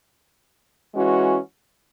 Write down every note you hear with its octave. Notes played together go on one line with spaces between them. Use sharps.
E3 G#3 C#4 F#4